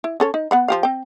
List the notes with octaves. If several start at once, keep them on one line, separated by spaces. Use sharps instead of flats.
E4
C#4 A4 C#5
D#4
B3 F#5 B5
F3 G4 F5
C4 G5